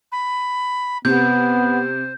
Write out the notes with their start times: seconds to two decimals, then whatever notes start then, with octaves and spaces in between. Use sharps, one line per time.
0.11 B5
1.05 C3 B3 C5 G6